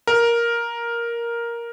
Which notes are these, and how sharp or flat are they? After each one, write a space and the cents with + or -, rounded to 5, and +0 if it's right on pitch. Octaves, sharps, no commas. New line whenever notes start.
A#4 +5